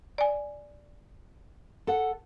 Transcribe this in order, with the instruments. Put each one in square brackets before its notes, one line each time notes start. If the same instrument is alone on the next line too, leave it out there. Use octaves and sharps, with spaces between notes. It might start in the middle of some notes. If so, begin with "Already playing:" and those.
[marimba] D5 G#5
[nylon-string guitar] A4 F#5